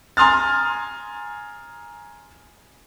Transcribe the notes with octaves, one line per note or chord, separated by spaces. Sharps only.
G#5 A#5 C6 D#6 F6 A6